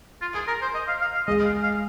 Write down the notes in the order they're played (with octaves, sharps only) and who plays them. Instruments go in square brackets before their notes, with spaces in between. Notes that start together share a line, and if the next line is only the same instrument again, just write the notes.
[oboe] F4
G#4
A#4
C5
D#5
F5
F5
F5
[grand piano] G#3 [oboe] D#5
[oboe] F5
F5